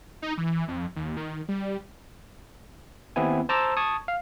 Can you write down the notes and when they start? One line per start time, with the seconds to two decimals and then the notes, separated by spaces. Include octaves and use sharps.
0.22 D#4
0.38 E3
0.68 F2
0.96 D#2
1.17 D#3
1.48 G3
3.16 D#2 B3 C4 E4 G#5
3.49 C5 A5 A#5 D6 E6
3.77 A5 C#6 D#6 G#6
4.08 F5